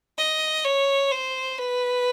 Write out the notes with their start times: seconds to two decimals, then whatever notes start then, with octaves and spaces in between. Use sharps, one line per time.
0.18 D#5
0.64 C#5
1.11 C5
1.58 B4